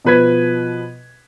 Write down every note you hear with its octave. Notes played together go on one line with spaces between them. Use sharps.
B2 F3 B4 G#6 B6